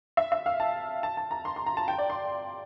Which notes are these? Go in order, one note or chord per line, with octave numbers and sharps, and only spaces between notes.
E5
E5
F5
A5
A5
A5
A#5
C6
C6
A#5
A5
G5
D5
C6